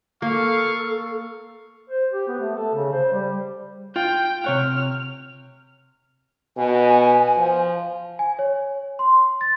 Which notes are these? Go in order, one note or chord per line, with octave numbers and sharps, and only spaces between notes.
A#3 A4 F5 C#6
C5
G4
B3
A3
A4
C#3
C5
G3
F4 G5
C3 C#5 F#5 F6
B2 G#5
F3
G#5
C#5
C6
A6